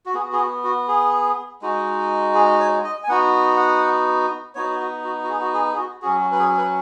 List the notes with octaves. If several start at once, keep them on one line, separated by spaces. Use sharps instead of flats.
F#4
B3 F#4 G#4
G#4
F#4
F#4
G#4
G#3 D#4 F#4
G#4
C#5
D#5
G#5
B3 D#4 F#4 F#5
F#5
B3 D#4 F#4 C#5
F#4
F#4
F#4
G#4
F#4
G#4
G#4
F#4
F#3 C#4 F#4 G#4
F#4
B4
G#4
B4